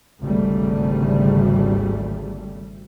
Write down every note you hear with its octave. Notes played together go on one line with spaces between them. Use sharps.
G#1 D2 C#3 G3 A3